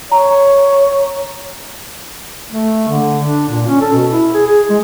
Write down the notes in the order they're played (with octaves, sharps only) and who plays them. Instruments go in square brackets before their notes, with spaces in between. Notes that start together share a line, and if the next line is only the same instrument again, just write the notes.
[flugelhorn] C#5 [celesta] A#5
[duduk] A3
D3
D4
A#2
C#4
A4
B2
E4
G#4
G#4
G#3